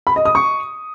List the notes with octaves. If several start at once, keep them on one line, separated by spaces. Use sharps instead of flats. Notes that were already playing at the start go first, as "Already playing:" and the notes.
B5
D#5
D#6
C#6